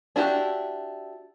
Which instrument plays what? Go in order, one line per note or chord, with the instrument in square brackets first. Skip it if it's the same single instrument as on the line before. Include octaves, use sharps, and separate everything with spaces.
[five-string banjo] D4 E4 F#4 G4